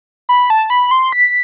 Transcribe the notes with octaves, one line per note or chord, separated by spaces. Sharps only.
B5
A5
B5
C6
B6